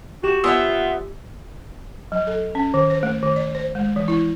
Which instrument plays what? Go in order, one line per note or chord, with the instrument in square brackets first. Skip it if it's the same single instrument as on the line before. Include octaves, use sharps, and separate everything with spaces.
[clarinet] F#4 [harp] G4 E7
[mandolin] B3 C5 E5 [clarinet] F4 [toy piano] D5 G#5 E6
[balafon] F#3
A4
C#4
D#3
C5
A3
D#3
D5
C5
G#3
E3
E4